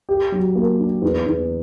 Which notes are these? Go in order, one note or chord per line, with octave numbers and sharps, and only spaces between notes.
G4
F#3
A#3
D4
E2
E2